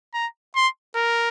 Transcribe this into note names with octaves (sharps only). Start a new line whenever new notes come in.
A#5
C6
A#4